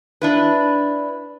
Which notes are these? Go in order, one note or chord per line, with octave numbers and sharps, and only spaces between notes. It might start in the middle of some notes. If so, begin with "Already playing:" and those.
D4 E4 B4